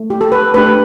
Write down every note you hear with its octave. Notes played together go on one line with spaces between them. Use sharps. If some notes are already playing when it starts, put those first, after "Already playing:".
Already playing: A3
G4
A4
B4
A3 D4 G4 B4